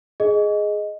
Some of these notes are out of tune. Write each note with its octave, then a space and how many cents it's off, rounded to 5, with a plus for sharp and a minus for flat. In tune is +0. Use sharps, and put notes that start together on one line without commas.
G#4 +5 D#5 +0